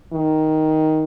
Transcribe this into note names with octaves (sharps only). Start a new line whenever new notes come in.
D#3